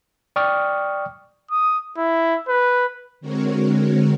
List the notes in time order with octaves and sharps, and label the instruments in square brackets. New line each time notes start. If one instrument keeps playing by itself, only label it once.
[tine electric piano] D5 G5 C#6 D#6 F6
[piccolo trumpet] D#6
E4
B4
[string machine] D3 G#3 C4 F#4 A#4 C#5